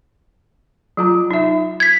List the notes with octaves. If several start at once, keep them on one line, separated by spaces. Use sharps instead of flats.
F#3 F4 A#5
D#4 E5
G#6 B6